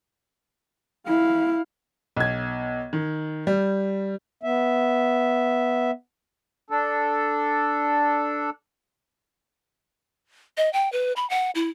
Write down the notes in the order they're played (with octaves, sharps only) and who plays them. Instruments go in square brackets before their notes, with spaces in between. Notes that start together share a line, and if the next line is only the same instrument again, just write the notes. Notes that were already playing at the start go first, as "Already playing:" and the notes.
[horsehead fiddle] E4 F5
[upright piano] B1 G#6
D#3
G3
[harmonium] B3 E5
[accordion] D4 A4
[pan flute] D#5
G5
B4
B5
F#5
E4